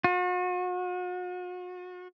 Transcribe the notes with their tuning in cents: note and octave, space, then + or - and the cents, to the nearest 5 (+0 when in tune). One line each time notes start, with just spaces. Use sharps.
F#4 -40